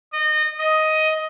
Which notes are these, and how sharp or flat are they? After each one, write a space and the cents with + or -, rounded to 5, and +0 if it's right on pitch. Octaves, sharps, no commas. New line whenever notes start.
D#5 -25
D#5 +10